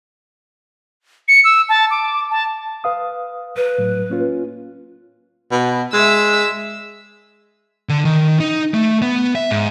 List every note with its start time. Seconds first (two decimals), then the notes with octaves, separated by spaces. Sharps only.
1.28 C#7
1.44 E6
1.69 A5
1.91 D6
2.30 A5
2.84 B4 F5 D#6
3.57 B4
3.78 A2 F#3
4.10 A#3 C#4 F4
5.52 B2
5.93 G#3 E5 E6
7.89 D3
8.05 D#3
8.40 D#4
8.74 A3
9.02 B3
9.35 E5
9.51 G#2